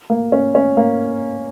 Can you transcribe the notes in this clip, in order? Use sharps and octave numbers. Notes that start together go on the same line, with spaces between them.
A#3
C#4
C#4
A#3